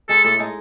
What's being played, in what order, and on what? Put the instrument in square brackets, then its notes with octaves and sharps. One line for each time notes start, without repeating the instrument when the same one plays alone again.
[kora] G#3 D#4 [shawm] A4
[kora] A2 [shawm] A4
[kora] G#3 D#4